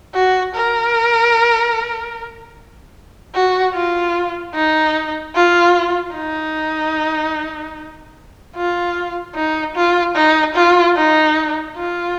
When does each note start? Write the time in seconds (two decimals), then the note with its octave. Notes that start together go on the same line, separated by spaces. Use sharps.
0.14 F#4
0.54 A#4
3.34 F#4
3.75 F4
4.54 D#4
5.35 F4
6.15 D#4
8.55 F4
9.35 D#4
9.75 F4
10.15 D#4
10.55 F4
10.96 D#4
11.76 F4